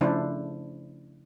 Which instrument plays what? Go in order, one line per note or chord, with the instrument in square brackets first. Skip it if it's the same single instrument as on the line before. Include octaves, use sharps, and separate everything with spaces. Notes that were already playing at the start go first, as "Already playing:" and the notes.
[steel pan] C#3 F3 A3 D4 E4 C5